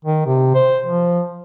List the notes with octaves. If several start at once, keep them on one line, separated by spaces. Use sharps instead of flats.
D#3
C3
C5
F3